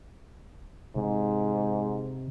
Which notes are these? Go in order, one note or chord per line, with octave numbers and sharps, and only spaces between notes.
G#2 C3